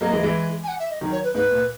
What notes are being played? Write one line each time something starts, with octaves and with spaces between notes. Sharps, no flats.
F#3 A#3 D#5
E3 G#3
E3 G#3
G#5
F#5
E5
D#5
D#3 F#3
C#5
B4
G#2 B4
A#2